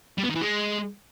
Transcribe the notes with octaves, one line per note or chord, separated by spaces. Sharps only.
G3
B3
D#3
E3
G#3